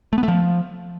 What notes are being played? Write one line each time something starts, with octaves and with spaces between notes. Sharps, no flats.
A3
B3
A3
F3